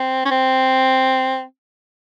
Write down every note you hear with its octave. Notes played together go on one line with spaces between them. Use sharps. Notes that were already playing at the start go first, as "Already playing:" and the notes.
Already playing: C4
C#4
C4